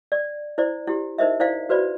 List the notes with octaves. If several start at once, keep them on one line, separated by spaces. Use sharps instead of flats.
D5
E4 C5 D5
E4 G4
D#4 A#4 C5 D#5 E5
E4 C5 D5 F5
F#4 B4 C5 D5 B5